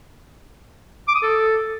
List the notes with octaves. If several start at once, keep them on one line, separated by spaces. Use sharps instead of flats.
D6
D#6
A4